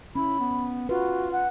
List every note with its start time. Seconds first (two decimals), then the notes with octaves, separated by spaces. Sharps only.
0.15 C#4 E4 B5
0.39 B3
0.89 F4 F#4 B4
1.32 F#5